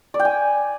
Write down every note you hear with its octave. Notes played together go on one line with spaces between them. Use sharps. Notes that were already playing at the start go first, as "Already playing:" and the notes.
D5
G5
G#5